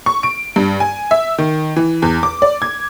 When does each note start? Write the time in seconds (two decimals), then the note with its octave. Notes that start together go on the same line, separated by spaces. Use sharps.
0.06 C#6
0.23 D7
0.56 G2
0.80 G#5
1.11 E5
1.38 D#3
1.76 E3
2.02 E2
2.23 D6
2.42 D5
2.62 G#6